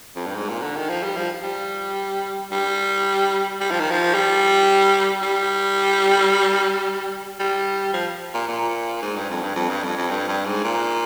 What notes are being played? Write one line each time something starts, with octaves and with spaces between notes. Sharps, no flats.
F2
G2
G#2
A#2
D3
D#3
F3
G3
F3
G3
G3
G3
F3
D#3
F3
G3
G3
G3
F3
A#2
A#2
G#2
G2
F2
G2
F2
G2
F2
F2
G2
G2
G#2
A#2